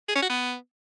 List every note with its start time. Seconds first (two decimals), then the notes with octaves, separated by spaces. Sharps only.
0.08 G#4
0.15 C#4
0.23 F#4
0.30 B3